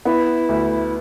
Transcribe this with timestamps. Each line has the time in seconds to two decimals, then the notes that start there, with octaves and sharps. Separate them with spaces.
0.05 B3 E4
0.49 D2